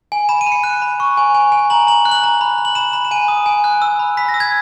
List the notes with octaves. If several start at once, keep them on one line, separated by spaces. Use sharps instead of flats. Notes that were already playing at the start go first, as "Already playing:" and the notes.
G#5
B5 E7
D#7
B5
C#7
F#6
B5
C#6
G#5
G#5
G#5
A#5 F#7
A#5 F#7
F#6
F#7
A#5
B5
B5
F#7
B5 E7
B5
E7
G#5 D#7
D#6
G#5
F#6
E6
B5
B5 B6
A#6
E6
G#6